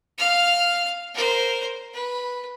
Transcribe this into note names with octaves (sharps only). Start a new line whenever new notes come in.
F5 F6
A#4 C5
B4